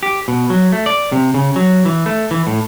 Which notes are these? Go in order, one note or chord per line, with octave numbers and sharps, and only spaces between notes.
G4
B2
F#3
A3
D5
C3
C#3
F#3
E3
A3
E3
A2